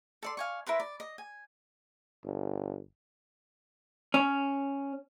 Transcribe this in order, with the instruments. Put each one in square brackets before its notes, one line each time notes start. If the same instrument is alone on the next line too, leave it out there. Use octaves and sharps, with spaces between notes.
[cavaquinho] A4 D5 C6
F5 G#5 C#6
E4 A#4 B4 C6
D5
D#5
G#5
[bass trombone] G1
[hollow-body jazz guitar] C#4